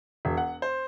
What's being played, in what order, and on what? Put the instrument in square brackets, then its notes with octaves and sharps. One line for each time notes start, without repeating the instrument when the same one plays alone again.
[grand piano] E1
F#5
C5